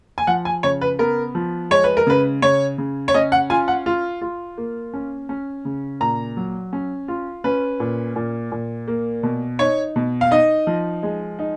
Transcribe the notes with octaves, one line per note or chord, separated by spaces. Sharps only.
G#5
F3 F#5
G#5
C#3 C#5
B4
B3 A#4
F3
G#3 C#5
B4
A#4
C#3 B4
C#3 C#5
C#3
C#5
C#4 D#5
F#5
F4 G#5
F#5
F4
F4
A#3
C#4
C#4
C#3
A#2 A#5
F#3
C#4
F4
C#4 B4
A#2
A#2
A#2
A#3
B2
D#4 C#5
B2
F5
D#4 D#5
F3
G#3
D#4